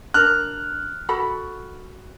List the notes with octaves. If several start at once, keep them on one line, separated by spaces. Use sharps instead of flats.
D4 A#4 F6 F#6
F#4 A4 B5